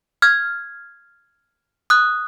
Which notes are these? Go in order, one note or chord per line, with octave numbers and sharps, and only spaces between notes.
F6 G#6
D#6 F#6